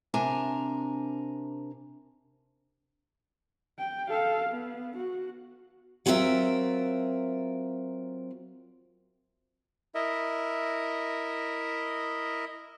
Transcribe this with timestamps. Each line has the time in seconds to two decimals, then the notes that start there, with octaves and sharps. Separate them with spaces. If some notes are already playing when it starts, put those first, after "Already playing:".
0.14 C3 D4 A#4 G#5 A#5
3.79 G5
4.10 A4 F5
4.49 B3
4.97 F#4
6.06 F#3 C4 F4 A#4 E5
9.95 E4 A#4 D#5 E5